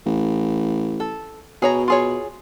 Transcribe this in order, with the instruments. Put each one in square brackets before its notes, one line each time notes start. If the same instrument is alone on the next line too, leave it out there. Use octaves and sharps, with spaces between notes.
[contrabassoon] A1
[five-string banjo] A4
[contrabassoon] B2 [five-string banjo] G#4 C#5 A#5
[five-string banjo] F4 G#4 C#5